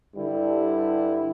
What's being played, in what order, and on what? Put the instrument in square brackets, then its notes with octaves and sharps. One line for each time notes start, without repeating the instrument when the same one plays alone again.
[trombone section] G2 D3 G3 E4